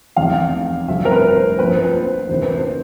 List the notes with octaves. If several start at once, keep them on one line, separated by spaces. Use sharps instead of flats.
F1 E2 C3 F5
G1 F2 C3 E5
A#4
B4
C5
A#1 A#2 F3 B4
C5
B4
E2 C3 D#3 C5
B4
C5